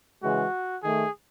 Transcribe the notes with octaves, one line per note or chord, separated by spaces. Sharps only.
C#3 E3 G#3 F#4
D#3 A3 G#4